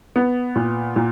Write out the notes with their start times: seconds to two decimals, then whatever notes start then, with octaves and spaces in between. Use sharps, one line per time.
0.16 B3
0.56 A#2
0.96 A#2